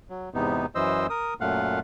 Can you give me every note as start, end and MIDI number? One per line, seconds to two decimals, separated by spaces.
0.09 0.29 54
0.34 0.66 40
0.34 0.66 44
0.34 0.66 48
0.34 0.66 59
0.34 0.66 63
0.75 1.07 42
0.75 1.07 52
0.75 1.07 72
0.75 1.07 75
0.75 1.07 88
1.10 1.34 70
1.10 1.34 87
1.41 1.80 42
1.41 1.80 46
1.41 1.80 57
1.41 1.80 77
1.41 1.80 78